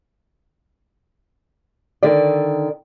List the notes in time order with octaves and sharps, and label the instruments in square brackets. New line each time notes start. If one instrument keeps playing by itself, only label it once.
[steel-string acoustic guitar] D3 D#3 D5